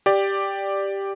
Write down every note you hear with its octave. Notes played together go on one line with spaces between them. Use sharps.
G4 D5